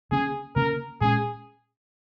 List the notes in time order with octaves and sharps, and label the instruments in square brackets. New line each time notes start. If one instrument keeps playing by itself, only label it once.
[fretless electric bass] C#3 A#3 C#4 [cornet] G#4
[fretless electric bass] C#3 A#3 C#4 [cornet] A#4
[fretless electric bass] A#2 G#3 C#4 [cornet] G#4